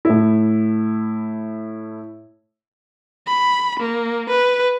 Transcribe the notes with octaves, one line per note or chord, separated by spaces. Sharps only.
A2 E4
B5
A#3
B4